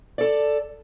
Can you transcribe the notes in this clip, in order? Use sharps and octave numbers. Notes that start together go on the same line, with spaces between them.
A4 D5